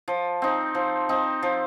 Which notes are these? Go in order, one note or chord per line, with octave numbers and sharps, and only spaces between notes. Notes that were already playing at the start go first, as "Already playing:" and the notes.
F3
C4 D#4
F3
C4 D#4
F3